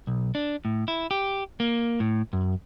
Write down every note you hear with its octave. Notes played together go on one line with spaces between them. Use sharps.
B1
D4
A2
E4
G4
A#3
A2
F#2